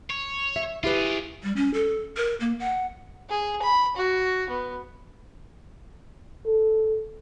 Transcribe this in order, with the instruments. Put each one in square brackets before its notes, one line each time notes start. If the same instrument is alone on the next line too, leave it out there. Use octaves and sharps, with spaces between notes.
[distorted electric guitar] C#5
[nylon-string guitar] E5
[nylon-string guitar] E4 G4 B4 [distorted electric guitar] F4 G#4
[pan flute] G3
C#4
A4
A#4
A#3
F#5
[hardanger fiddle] G#4
B5
F#4
B3
[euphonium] A4